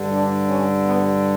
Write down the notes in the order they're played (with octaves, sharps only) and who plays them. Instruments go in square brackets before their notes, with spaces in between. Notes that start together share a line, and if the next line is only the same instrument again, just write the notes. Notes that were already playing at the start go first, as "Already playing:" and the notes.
Already playing: [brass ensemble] G2 D3
D4
C#4
B3